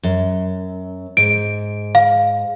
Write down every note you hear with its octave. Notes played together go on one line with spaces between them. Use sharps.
F#2
G#2 D7
F5